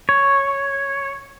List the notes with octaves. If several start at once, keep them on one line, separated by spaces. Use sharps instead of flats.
C#5